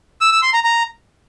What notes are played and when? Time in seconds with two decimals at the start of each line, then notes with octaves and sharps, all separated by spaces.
0.21 E6
0.32 E6
0.42 C6
0.53 A#5
0.64 A#5